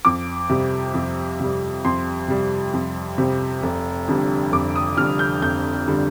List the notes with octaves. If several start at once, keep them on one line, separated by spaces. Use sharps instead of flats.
F2 D6
C3 G3
F2
C3 G3
F2 C6
C3 G3
F2
C3 G3
F1
F2 D3 G3
F1 D6
D#6
F2 D3 G3 F6
G6
F1 G6
D3 G3